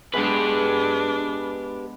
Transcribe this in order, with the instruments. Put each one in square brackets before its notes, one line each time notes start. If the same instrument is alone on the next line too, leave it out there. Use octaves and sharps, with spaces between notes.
[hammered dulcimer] G#3 B3 [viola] D4 [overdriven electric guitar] G4 B4